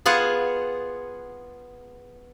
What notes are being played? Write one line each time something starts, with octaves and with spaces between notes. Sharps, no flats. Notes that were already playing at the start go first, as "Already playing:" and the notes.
B3 F4 G#4 F#5